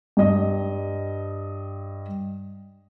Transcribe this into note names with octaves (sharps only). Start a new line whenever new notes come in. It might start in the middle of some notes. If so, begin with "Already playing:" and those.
G2 D#5